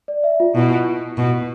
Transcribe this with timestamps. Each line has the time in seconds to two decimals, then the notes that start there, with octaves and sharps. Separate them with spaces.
0.08 D5
0.24 E5
0.40 F4
0.55 B2 E4
1.17 B2